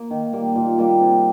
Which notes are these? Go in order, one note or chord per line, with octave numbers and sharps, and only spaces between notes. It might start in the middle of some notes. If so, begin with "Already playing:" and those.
Already playing: A#3
D#3
G3 A#3
A#2
G3 A#3
C3